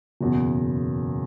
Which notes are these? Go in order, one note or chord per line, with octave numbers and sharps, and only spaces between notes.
F#1 E2 B2